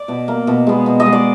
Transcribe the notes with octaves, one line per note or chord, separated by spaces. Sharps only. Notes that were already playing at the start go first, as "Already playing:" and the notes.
Already playing: D5
B2
A#3
B2
G#3 B3
B2
D#5
G#3 B3
D5